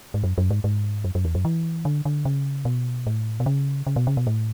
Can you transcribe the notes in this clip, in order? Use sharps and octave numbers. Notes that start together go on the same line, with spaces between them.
G#2
F#2
F#2
G#2
G#2
F#2
F#2
E2
F#2
E3
D3
D3
C#3
B2
A2
B2
C#3
C#3
B2
C#3
B2
A2